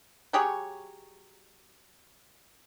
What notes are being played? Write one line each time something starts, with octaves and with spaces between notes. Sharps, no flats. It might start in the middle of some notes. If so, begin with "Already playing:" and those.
F#3 G4 G#4 C#5